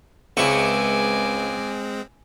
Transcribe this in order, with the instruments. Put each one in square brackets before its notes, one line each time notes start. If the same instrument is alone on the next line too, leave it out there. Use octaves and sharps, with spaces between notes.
[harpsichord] C#2 E4 C#6 [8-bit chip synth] G#3 C4 [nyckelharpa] G#5 D6